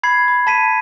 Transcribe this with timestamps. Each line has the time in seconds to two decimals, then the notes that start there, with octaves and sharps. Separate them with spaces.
0.03 B5 G#6 C7
0.28 B5
0.47 A5 B6 D#7